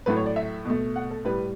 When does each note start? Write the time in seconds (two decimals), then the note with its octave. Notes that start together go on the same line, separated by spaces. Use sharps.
0.06 A2 F#3 A3 B4
0.16 C#5
0.26 D5
0.36 E5
0.65 B2 A3
0.96 F#5
1.11 A4
1.25 A2 G3 B4